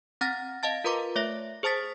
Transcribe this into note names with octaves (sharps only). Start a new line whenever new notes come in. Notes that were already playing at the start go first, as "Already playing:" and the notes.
C4 F#5 A#5 F6 A6 A#6
D#5 F5 A5 A6
F4 A#4 B4 A#5 C6 D6
A3 C#5 E5 A#6
G#4 C5 A5 D#6 A6 B6